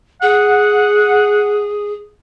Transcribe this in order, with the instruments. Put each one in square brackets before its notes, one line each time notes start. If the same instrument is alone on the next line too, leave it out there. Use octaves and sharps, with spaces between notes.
[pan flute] G#4 [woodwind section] F#5